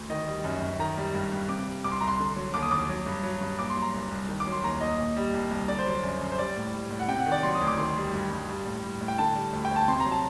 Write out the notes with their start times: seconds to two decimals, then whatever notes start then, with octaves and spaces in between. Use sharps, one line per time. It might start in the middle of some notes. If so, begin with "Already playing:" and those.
Already playing: D2
0.10 D#3 D#5
0.27 G3
0.44 F#2
0.62 F#2
0.79 D#3 A#5
0.97 G3
1.14 G2
1.32 G2
1.49 C3 D6
1.67 G3
1.84 C2 D6
1.92 C6
2.00 C2 A#5
2.08 C6
2.20 D3
2.36 F#3
2.54 D#2 D6
2.63 D#6
2.71 D#2 D6
2.89 F#3
3.06 G2
3.23 F#3
3.41 G2
3.59 A#2 D6
3.70 C6
3.76 F#3
3.82 A#5
3.94 C2
4.11 C2
4.29 D#3
4.40 D6
4.47 F#3
4.52 C6
4.63 D#2 A#5
4.81 D#2 D#5
4.99 A#2
5.16 G3
5.34 C2
5.51 C2
5.68 D3 D5
5.79 C5
5.86 F#3 D5
6.04 F#2
6.21 F#2
6.32 C5
6.38 G3 D5
6.57 A2
6.74 G3
6.91 A2
7.00 F#5
7.08 C3 G5
7.20 F#5
7.26 D#3
7.32 D5
7.43 F#3 C6
7.55 D#6
7.61 D2
7.67 D6
7.78 D#3 C6
7.96 G3
8.13 G2
8.31 G2
8.49 G3
8.66 A2
8.83 G3
9.01 A2
9.08 G5
9.18 D3 A5
9.35 G3
9.53 D2
9.65 G5
9.71 D2
9.76 A5
9.88 C3 C6
10.00 A#5
10.06 F#3
10.12 A5